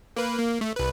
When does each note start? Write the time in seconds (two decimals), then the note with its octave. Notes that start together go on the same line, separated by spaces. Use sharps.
0.16 A#3 B4
0.39 A#3
0.61 A3
0.76 C2 B4